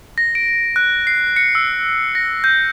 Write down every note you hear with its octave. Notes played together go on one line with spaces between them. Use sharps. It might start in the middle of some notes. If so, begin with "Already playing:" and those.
A#6
D7
F#6
C7
C#7
E6
A#6
G6